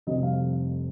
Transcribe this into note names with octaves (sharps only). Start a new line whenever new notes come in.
F1 F2 C3 G3 C4 D#5
F5